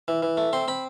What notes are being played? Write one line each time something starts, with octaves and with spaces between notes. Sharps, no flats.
E3
E3
A3
C4 C6
C4 B5